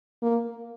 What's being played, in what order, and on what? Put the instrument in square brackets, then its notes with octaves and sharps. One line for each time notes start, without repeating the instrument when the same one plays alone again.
[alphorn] A#3